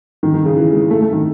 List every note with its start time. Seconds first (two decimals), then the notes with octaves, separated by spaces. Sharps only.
0.23 D#3
0.34 D#3
0.45 C#3
0.56 E3
0.72 G#3
0.90 A3
1.01 A3
1.12 D#3